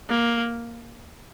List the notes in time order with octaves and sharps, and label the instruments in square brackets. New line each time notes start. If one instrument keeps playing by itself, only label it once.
[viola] A#3